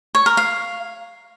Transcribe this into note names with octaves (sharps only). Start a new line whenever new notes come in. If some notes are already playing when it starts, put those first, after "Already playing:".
C#5
A#4
F5